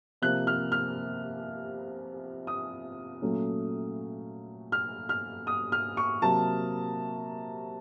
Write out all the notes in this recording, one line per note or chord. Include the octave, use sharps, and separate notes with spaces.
C3 F3 A#3 F#6
F6
F6
D#6
A#2 F#3 A3 C#4
F6
F6
D#6
F6
C#6
C3 F#3 A#3 A5